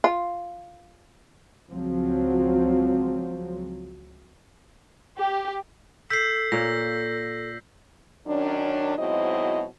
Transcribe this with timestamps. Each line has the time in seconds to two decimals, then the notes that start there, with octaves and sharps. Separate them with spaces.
0.04 F4
1.70 C#2 F3 F#3 C4
5.18 G4
6.10 A4 E6 G6 B6 C7
6.52 A#2 A#3 C#5 A#6
8.27 F#2 D#3 C#4 D4
8.98 G#2 B2 F#3 C4 E4 D#5